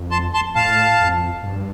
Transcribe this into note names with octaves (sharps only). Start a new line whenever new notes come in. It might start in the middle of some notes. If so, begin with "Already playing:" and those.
Already playing: F2
A5 C6
A5 C6
A2 F5 A5
F2
G2